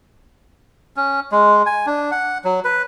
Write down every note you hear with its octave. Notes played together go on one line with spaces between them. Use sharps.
C#4
G#3
G#5
D4
F#5
F#3
B4